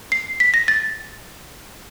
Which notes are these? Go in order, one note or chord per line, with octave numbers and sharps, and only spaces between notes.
C7
B6
A#6
A6